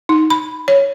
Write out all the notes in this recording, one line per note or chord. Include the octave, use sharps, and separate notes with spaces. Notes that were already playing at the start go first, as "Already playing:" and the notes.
D#4
B5
C#5